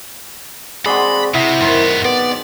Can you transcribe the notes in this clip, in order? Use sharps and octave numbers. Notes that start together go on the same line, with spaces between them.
G#3 C4 F#4 G#4 D5 B5 C6
C3 E4 D#5 F#5 G#5
F#2 D#3 B3 C5
B3 D5